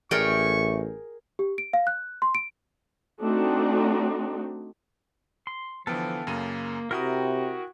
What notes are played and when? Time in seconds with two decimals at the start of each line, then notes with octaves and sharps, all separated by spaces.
0.11 A1 A3 G#4 A#4 D5 G5 C#6 F6
1.39 G4
1.58 D7
1.73 F5
1.87 F#6
2.22 C6
2.35 D7
3.22 A3 C4 D4 D#4 F#4
5.47 C6
5.87 D3 E3 F3 B3 A4 F5 G5
6.27 F#2 C#3 A#3 D#7
6.91 C3 E4 F#4 A#4 G5 A#5 D#6